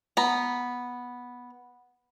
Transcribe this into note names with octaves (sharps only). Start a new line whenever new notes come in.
B3 A#5